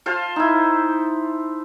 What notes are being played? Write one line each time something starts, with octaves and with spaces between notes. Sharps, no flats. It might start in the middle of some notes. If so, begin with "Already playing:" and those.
F4 C5 F5 A5
D#4 E4